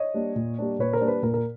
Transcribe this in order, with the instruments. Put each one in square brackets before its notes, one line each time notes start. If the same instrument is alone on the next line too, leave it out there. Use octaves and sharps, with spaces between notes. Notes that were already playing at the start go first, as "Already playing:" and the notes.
Already playing: [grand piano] C#5 D#5
G3 A#3 D4
A#2
G3 A#3 D4
A#2 B4 C#5
A#4 C5
G3 A#3 D4
B4
A#2 A#4
A#4